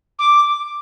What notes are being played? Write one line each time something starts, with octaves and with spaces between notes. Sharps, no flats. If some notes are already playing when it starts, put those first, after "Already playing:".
D6